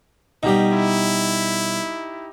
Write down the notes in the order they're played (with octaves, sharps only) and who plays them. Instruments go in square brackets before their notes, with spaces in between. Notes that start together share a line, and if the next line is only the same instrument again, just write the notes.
[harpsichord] B2 G3 [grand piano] D#4 G4
[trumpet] E4